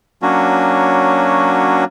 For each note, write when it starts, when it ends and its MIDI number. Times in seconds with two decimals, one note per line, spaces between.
0.22 1.84 54
0.22 1.84 58
0.22 1.84 61
0.22 1.84 62
0.22 1.84 66